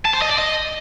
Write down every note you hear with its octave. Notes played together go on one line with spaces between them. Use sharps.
A5
C5
D#5
D5
D#5